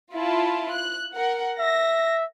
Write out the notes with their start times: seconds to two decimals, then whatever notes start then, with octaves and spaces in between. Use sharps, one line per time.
0.13 E4 F4 A5
0.73 F#6
1.13 A#4 F#5
1.59 E5 A#6